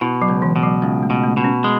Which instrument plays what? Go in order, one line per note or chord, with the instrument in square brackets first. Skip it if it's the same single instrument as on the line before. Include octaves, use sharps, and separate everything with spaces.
[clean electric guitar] B2 [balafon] E4
[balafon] F#3
[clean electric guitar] C#2
[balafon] E3
[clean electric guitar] B2
[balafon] F#3
[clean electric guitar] C#2
[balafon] A3
[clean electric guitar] B2
[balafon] A3
[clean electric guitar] B2
[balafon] C#4
[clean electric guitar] G#3